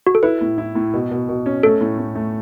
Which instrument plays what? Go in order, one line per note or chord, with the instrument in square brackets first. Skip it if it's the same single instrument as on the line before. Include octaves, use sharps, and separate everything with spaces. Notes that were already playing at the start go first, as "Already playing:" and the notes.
[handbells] F#4
A4
[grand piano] E4 [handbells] B4
[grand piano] A2
E4
A2
B2
B2
B2
C#4
[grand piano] A3 [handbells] A4
[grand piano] A2
A2
A3